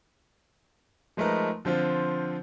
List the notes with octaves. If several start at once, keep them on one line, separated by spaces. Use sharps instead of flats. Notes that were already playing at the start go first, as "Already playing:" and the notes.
F3 G#3 A3 D#4 A#4 B4
D3 F3 C4 F4